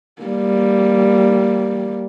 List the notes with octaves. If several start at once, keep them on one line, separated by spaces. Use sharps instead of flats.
G3 A#3